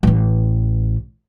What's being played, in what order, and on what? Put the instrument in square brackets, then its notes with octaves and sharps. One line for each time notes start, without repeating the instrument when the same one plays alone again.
[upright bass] A1 E3